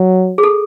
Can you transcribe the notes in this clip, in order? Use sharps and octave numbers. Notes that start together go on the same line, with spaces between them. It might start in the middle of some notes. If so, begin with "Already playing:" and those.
Already playing: F#3
G#4
A4